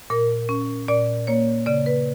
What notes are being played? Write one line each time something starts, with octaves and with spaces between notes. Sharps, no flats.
A#2 A#4
C#4
A#2 D5
A#3 C#5
C#3 D5
B4